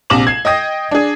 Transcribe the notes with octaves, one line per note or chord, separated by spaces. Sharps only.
A#1 C3 D6 E7 F#7
G#6 C7
D#5 G5 D#6 A#6
D4 G#4